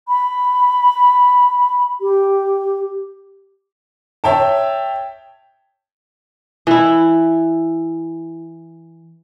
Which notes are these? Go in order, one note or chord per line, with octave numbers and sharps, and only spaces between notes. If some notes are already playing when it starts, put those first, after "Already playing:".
B5
G4
C#5 E5 G5 A5
E3 E4